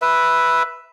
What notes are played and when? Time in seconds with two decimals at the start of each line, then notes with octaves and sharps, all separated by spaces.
0.02 B4 E5